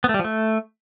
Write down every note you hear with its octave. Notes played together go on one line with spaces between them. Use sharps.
B3
A3
G3
F3
A3